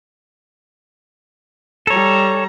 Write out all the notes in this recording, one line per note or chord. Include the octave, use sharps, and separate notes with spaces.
G3 A4 C#5 A#5